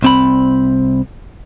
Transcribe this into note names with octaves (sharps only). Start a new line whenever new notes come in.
C2 C4 B5